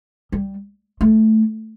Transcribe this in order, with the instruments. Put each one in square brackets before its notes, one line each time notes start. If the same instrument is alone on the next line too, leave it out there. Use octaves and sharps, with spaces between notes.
[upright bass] G3
A3